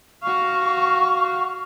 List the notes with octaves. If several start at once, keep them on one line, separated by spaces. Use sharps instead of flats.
F#4 F5 C#6